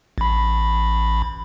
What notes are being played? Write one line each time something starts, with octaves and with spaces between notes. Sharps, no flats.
A1 B5